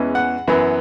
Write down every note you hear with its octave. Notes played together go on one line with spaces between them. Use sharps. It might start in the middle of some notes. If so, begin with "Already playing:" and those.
Already playing: E2 E3 G#3 C#4
F#5
F#2 E3 B3